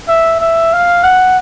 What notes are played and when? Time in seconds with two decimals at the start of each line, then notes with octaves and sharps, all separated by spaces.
0.08 E5
0.41 E5
0.73 F5
1.04 F#5